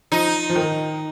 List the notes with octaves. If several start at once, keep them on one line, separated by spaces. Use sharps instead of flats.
F3 D#4
F3
D#3